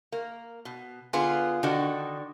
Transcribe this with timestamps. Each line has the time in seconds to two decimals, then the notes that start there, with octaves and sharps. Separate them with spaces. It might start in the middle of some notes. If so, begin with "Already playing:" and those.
0.12 A#3
0.65 B2
1.13 D3 B3 F4 G#4
1.63 D3 D#3 D4 F#4